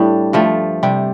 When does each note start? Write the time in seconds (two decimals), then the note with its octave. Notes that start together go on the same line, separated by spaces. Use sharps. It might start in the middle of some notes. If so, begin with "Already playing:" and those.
Already playing: A2 G3 D4
0.33 G2 F3 A3
0.83 C3 G3